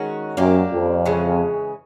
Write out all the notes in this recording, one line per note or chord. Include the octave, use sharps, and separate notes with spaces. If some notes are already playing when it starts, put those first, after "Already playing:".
Already playing: D#3 G#3 C#4 F#4
F#2 A#3 D4 G4
F2
C#3 E3 G#3 C#4